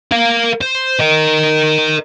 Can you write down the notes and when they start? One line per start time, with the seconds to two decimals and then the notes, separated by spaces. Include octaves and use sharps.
0.12 A#4 F5
0.61 C5
1.00 A#4 D#5